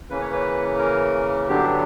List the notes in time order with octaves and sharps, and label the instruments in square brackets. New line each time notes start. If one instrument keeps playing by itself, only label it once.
[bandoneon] C#3 E3 A#3 C#4 B4
C#5
B4
A#4
G2 D3 F#3 B3 D4 G4